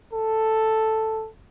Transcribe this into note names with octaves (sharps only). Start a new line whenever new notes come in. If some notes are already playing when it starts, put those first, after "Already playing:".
A4